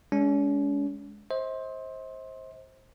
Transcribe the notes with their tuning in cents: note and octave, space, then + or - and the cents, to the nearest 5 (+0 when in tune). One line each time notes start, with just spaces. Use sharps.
G#3 +0 C#4 +40
C5 +15 D#5 +45